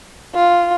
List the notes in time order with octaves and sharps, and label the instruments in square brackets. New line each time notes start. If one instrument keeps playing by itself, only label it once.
[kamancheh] F4